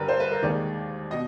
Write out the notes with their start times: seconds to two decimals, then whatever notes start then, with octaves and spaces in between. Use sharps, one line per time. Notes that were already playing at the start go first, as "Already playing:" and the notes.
Already playing: G2 D3 G3 A#4 B4
0.08 C5
0.20 B4
0.31 A#4
0.43 D#2 D#3 G#3 D5
1.11 B2 D#5